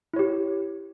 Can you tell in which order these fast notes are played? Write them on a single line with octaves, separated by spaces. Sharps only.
E4 C#5 G4